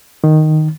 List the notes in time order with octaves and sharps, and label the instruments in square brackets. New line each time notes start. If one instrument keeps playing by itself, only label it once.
[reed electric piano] D#3